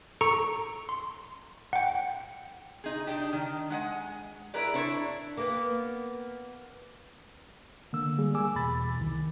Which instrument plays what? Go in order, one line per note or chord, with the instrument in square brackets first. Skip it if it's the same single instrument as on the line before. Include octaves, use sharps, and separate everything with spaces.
[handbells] A4 A#5 C#6 C#7
C6
F#5 G5
[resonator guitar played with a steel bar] D#4 G#4
D4 D#4 G4
D#3
G#3 F#5 G#5
E4 G#4 A#4 B4 D5
D4 E4 C#5
[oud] A#3 B3
[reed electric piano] D3 A#3 E6
G3 A#3 G#4
G#5 D6 E6
E2 B2 B5 A6
C2 D#3